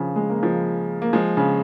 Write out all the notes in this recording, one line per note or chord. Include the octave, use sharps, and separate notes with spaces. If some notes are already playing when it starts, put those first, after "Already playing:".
Already playing: C#3 F3
G#3
A#3
F3 G#3
A#3
F3 G#3
C#3